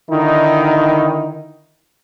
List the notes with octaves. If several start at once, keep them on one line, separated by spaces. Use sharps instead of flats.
D3 D#3 D#4 E4